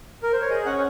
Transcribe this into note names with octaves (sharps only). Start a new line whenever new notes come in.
A#4
C5
C#5
G#4 D#5
C#4 F#5